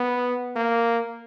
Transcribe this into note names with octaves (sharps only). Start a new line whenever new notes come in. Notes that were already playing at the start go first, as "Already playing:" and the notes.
Already playing: B3
A#3